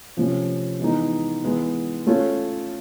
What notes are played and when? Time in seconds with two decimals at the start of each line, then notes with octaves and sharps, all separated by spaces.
0.17 C3 F3 A3 C#4
0.80 E3 G#3 B3 D#4
1.43 E3 G#3 B3
2.07 A3 C#4 F4 A4 C#5